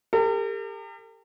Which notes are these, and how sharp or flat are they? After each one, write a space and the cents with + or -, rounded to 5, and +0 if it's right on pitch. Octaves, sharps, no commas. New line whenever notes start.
G4 +35 A#4 -45